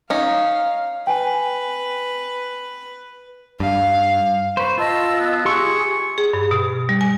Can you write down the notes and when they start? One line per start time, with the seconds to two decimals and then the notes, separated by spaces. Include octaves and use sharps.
0.10 C#4 D#4 F5
1.07 B4 G5 G#5
3.60 G2 F5
4.57 B4 C5 C#6
4.78 F4 D#5 A5 E6
5.19 B3
5.45 G4 G#4 C6 C#6 E6
6.18 G#4
6.33 G2
6.51 B2
6.89 G3
7.01 G#5